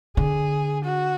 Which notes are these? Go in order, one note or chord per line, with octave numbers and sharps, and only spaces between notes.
D3 G#4
F#4